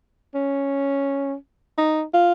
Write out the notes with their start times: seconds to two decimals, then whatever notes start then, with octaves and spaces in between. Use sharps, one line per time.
0.35 C#4
1.78 D#4
2.13 F4